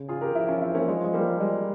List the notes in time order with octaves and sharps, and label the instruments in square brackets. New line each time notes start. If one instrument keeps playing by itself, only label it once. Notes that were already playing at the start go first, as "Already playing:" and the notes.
Already playing: [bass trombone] C#3
[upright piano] F4 G#4
G4 A#4
[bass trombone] F3 [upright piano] E4 G4
[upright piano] C#4 F4
C4 E4
A#3 C#4
G#3
G#3
G3 A#3
[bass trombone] G3 [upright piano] G#3